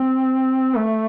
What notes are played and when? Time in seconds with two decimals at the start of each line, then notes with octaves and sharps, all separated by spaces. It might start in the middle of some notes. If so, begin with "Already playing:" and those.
Already playing: C4
0.77 A3